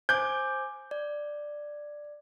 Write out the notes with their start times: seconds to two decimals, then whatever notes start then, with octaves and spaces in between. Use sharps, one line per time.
0.09 C5 G#5 D6 G6
0.91 D5